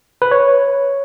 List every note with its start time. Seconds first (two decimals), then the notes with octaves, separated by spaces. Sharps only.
0.22 B4
0.31 C#5